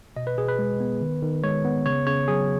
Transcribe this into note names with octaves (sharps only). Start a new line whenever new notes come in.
B2 D#5
B4
B2 G#4
B4
G#3
B3
D#3
D#3
G#3 C#5
B3
C#3 C#5
C#3 C#5
F#3 G#4